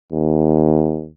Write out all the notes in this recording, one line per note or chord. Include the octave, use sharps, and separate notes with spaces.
D#2